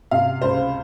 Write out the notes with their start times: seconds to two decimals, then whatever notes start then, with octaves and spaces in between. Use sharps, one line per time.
0.11 C3 F5
0.42 C#2 C5